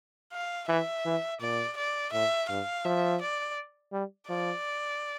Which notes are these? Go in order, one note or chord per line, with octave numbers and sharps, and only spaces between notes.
F5
E3 E5
E3
A#2 D5
D5
A2 E5
G2 F5
F3 E5
D5
G3
F3 D5